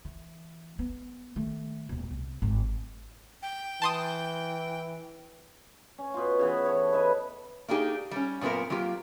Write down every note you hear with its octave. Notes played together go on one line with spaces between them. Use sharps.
E3
B3
D#3 A3
D#1 B2
C2
G#1 A2
G5
E3 A5 C6 D#6
C#4
B2 F4
C#3 E3 B3
A4 C#5
B4 D#5 E5 B5
A#3 D4 D#4 G4 G#4
G3 C#4
F#2 A#2 B3 C4 A#4
F#3 A#3 F4 G4